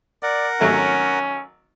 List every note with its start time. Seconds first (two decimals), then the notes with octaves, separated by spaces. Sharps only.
0.23 A#4 D5 F#5
0.61 G#1 F#3 A3 C#4